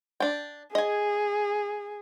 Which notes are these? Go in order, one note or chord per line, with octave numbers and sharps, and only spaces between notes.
D4 G5
G#4 D#5 G#5